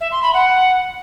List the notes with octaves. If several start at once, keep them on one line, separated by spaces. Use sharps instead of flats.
E5
C6
B5
F#5